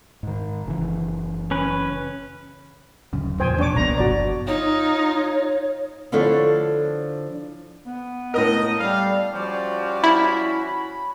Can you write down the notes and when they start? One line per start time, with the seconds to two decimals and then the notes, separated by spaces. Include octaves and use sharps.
0.23 G#2 D#3
0.66 F#1 C#3 E3
1.51 C#4 B4
3.13 D1 F#2 C#3
3.40 E2 A#2 F3 C5 G5 G#5
3.58 B2 A#3 D4 C#5 D6
3.76 C2 A#2 F3 B3 A#5
3.98 G1 F#4 D5
4.47 D#4 F4 C#5
6.12 D3 F3 D4 E4 A4 C#5
7.87 B3
8.34 A2 A#4 D#5
8.78 G3 A4 F5
9.33 F3 G3 C#4 F#4 D5
10.04 E4 B5